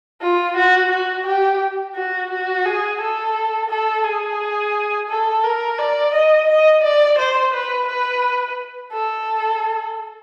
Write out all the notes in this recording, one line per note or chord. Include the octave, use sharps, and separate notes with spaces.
F4
F#4
F#4
G4
F#4
F#4
G#4
A4
A4
G#4
A4
A#4
D5
D#5
D#5
D5
C5
B4
B4
A4